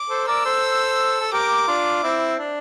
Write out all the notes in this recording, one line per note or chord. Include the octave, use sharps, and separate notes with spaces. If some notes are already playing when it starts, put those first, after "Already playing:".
Already playing: D6
A4 C5
A#4 D5 E6
A4 C5
A4
G4 A#4 D6
D4 F4
C4 E4
D4